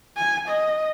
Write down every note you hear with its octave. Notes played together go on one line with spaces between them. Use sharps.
G#5
D#5